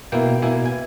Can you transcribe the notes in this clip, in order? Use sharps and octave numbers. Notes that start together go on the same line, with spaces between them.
B2 A#3 E4 G5
B2 A#3 E4 G#5
G#5